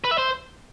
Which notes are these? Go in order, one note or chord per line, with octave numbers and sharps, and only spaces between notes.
B4
E5
C5